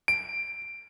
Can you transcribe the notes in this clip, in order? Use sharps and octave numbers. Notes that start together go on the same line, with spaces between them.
D7